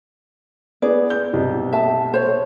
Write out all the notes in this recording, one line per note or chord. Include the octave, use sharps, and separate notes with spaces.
B3 G#4 D5
G6
B1 C3 G3
E5 A5
C5 C#5